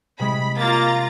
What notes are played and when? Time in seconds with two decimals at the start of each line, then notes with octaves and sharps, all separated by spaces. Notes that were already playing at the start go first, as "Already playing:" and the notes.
0.19 C3 G#3 B5
0.57 A#3 F4 A#5 A6